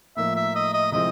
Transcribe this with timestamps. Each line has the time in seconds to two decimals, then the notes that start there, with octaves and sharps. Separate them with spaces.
0.16 A2 F3 A#3 D#4 E5
0.36 E5
0.55 D#5
0.74 D#5
0.92 C3 F3 G#3 C4 E4 D#5